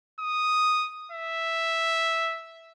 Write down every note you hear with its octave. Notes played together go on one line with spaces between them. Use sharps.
D#6
E5